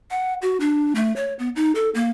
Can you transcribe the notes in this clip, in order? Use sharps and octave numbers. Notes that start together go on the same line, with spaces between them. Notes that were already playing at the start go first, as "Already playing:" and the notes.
F#5
F#4
D4
A3
C#5
B3
D#4
A4
A#3